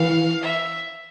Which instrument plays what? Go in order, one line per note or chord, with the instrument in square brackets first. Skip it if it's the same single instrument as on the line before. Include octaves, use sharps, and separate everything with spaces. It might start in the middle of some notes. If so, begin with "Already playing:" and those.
Already playing: [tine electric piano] E3 [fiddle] F5
[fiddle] E5